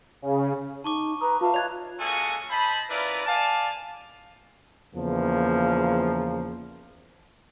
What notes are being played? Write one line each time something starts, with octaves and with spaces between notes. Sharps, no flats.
C#3
D#4 A5 C#6 D6
B4 A#5 D#6
F4 B4 E5 F5 A5
C#5 D#5 F#6 G#6 F7
G#3 A#3 C#4 F#4 A4 G#5
C5 D#5 A5 B5
C#4 E4 F4 A#4 B4 D5
D5 F5 G#5 A5
E2 C#3 F3 A#3